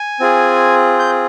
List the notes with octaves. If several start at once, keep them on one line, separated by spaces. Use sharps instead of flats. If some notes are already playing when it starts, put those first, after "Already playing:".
Already playing: G#5
C4 F4 G#4
G6